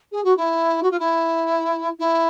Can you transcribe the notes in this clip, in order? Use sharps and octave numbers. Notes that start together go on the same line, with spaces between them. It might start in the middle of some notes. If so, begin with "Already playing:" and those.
G#4
F#4
E4
F#4
F4
E4
E4